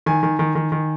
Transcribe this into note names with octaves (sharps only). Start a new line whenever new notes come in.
D#3 G#5
D#3
D#3
D#3
D#3